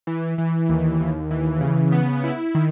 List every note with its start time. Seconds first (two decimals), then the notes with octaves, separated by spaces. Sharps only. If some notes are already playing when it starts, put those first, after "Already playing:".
0.07 E3
0.38 E3
0.69 D#2
1.00 D#2
1.31 E3
1.61 C#3
1.92 B3
2.24 E4
2.55 D#3